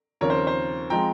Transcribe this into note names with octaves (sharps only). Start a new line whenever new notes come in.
D#2 C#3 F3 C4 A#4 C#5
C5
A#4
C5
F3 G#3 C4 G5 A#5